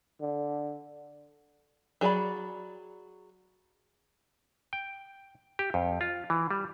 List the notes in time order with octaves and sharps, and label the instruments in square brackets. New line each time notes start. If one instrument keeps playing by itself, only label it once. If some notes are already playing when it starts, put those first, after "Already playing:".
[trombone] D3
[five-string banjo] F#3 G#4 D5 A#5 B5
[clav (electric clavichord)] G5
G4
F2
F4
E3
G3